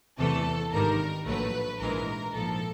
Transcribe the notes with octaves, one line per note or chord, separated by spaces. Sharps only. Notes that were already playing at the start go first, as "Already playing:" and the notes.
E2 C3 E3 A3 A4
G#1 G2 D#3 G3 A#4
A#1 A2 F#3 A3 B4
A#1 G#2 E3 G#3 A#4
A#1 G#2 F3 A4